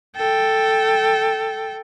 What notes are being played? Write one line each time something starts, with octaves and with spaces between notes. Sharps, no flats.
A4 G5